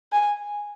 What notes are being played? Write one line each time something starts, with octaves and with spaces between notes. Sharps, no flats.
G#5